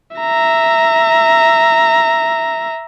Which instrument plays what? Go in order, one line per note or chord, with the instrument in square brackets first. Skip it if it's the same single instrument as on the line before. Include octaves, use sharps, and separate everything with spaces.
[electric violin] E5 A#5